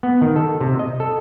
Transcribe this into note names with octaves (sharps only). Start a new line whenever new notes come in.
B3
D#3
A4
C3
D#5
A4